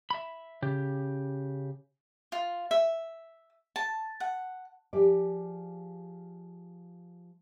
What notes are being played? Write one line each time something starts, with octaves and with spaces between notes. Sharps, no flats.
E5 B5
C#3 G4
F4
E5
A5
F#5
F3 G4 G#4 D5